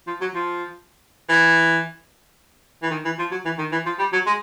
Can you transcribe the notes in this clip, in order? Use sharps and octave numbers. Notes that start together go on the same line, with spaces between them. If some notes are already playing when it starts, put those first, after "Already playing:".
F3
F#3
F3
E3
E3
D#3
E3
F3
F#3
E3
D#3
E3
F3
G3
F#3
G#3